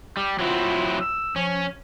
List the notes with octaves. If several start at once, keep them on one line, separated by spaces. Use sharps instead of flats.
G3
F#3 C4 E4 F4
E6
F3 C#4